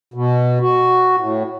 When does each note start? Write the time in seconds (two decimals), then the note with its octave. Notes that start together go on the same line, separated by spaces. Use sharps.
0.14 B2
0.61 F#4
1.19 A2